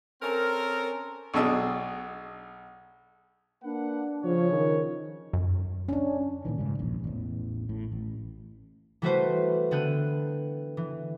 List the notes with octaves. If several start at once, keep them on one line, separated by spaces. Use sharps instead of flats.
C4 C#4 A4 A#4
B1 B2 D4 G#4 D#5 E6
A#3 D4 B4 F#5
C#3 F3 C#5
D#3
F#2
C#4 D4
A#2 D#3 E3
G#2 C#3 G3
E1 A#1
A1 E2
A2
A1
E3 G3 A3 F#4 B4 C5
D3 B3 G5 F#6 D#7
E3